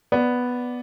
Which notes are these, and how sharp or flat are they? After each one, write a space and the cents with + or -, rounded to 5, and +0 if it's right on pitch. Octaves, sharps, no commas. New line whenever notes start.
B3 +0 D5 +0